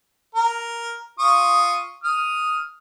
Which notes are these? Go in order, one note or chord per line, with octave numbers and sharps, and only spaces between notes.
A#4
F4 C#6 D#6
D#6 F6